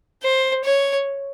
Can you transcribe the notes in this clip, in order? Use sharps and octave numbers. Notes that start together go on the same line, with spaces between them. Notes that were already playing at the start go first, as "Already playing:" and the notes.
C5
C#5